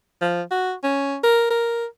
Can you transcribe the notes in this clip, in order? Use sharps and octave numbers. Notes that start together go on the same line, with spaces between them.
F3
F#4
C#4
A#4
A#4